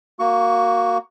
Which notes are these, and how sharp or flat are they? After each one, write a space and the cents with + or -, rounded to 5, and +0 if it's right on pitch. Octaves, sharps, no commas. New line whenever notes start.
A#3 +0 F#4 +0 C#6 +20